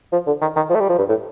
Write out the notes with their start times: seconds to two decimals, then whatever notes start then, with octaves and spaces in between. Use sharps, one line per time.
0.12 F3
0.27 D3
0.41 D#3
0.56 D#3
0.70 F3
0.75 A3
0.80 G3
0.89 F3
0.98 G2
1.09 A2